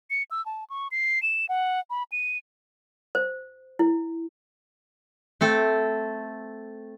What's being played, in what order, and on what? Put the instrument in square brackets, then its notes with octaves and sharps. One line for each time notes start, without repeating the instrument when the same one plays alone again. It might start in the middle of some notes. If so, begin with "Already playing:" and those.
[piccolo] C#7
E6
A5
C#6
C7
E7
F#5
B5
D#7
[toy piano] C5
E4
[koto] A3 C4 A4